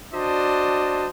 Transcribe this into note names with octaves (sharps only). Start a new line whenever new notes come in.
D4 F#4 C5 D5 D#5 A5